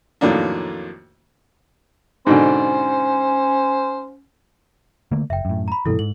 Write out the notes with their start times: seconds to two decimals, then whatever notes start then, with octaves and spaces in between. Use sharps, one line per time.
0.21 F2 A2 D#3 F#3 A#3 D4
2.27 G#2 B2 D3 C#4 C5
5.12 D3 A3 A#3
5.30 F#1 E5 G5
5.45 F#2 A2
5.68 A#5 B5
5.86 G2 B2 E3 E4 A4
5.99 G#2 F#7